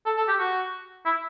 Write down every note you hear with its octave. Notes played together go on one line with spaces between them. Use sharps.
A4
A4
G4
F#4
E4